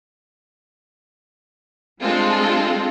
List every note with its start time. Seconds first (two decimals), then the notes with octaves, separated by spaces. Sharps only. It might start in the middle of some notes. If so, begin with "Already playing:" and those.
2.01 G3 G#3 C4 D4 F4 A4